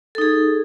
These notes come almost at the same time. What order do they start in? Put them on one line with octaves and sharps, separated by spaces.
A4 D#4 G#4